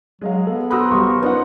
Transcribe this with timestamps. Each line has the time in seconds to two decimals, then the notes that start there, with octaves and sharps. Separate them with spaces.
0.21 F#3 G#3 D#5 F5
0.47 B3 A4
0.71 F#4 A#4 C5 B5 D#6 E6 F#6
0.91 B1 G3 C#6
1.23 F3 C#4 D#4 B4 F#5